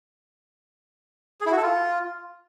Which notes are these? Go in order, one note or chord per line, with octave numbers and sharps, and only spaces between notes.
G#4
E4
F#4
A4
F4